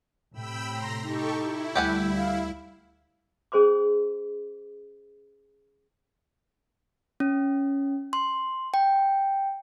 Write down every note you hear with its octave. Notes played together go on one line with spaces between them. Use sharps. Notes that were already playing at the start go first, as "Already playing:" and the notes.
A2 C3 G5 B5 E6
A#5 C6 A#6
D#4 G4 A4 C#6
E4
D2 G3 A3 G4 F#5 G#5
F5
C#4 G#4 C5 C6 D6
C#4
C6
G5